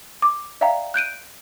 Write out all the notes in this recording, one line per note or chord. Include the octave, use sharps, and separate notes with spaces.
D6
D5 E5 F5 G5 A#5
F#6 G6 D7 D#7